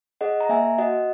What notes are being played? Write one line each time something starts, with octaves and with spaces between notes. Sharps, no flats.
G#4 D#5 F#5
A#5
A#3 E5 G#5
F#4 D#5 F#5